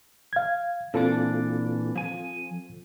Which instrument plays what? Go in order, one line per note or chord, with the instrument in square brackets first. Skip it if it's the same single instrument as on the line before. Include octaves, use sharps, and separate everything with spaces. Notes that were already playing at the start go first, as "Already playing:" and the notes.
[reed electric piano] F5 G#6
[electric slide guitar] A#2 E3 D4 [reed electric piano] C4 F4 A4
[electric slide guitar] F3 G#5